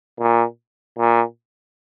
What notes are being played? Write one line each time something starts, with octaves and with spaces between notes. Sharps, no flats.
A#2
A#2